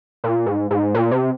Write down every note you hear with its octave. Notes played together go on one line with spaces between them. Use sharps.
A#2
G#2
G#2
A#2
C3